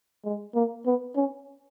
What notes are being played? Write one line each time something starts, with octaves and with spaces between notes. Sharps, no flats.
G#3
A#3
B3
C#4